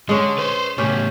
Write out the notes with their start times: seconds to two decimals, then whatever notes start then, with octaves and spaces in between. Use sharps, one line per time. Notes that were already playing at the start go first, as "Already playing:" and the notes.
0.09 D3 G#3 C#4
0.38 B4 C5
0.78 A2 C#3 C#4 G4